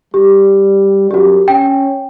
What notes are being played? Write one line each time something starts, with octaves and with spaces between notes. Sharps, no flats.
G3 G4
F#2 F#4 G4
C#4 G5